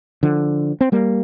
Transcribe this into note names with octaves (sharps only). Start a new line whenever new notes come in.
D3 F3
C4
G3 A#3